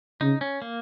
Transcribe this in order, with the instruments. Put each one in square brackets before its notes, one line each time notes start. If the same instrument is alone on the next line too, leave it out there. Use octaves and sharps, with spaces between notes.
[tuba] C#3 [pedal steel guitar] D#4
[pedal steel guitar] C#4
A#3